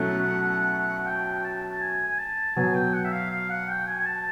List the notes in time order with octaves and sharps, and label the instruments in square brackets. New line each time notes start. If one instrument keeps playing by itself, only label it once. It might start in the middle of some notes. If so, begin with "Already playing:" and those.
Already playing: [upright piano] B2 F#3 A3 C#4 E4 [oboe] F#5
[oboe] G5
A5
G#5
G#5
A5
[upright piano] B2 F#3 B3 [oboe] G#5
[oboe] G5
F#5
E5
F5
F5
F#5
G5
G#5
G#5
A5